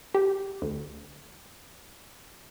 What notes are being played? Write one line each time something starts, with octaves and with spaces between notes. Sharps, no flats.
G4
D2